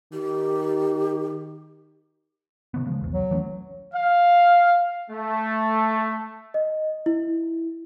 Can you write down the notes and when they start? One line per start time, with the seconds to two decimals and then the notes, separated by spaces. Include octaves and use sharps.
0.13 D#3 G4
2.74 C3 D#3 B3
2.87 C#3 F3 G#3
3.01 B1 E2
3.13 F#3
3.31 E3 A3 C#4
3.94 F5
5.11 A3
6.54 D#5
7.06 E4